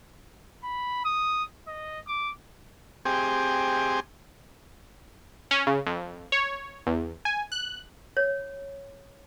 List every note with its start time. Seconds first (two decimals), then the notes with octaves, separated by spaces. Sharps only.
0.64 B5
1.05 D#6
1.67 D#5
2.07 D6
3.05 C4 G4 G#4
5.51 C#4
5.67 C#3
5.86 F2
6.32 C#5
6.87 E2
7.25 G#5
7.52 F#6
8.17 C#5